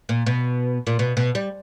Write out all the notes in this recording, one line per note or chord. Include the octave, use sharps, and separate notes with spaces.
A#2
B2
A#2
B2
B2
G3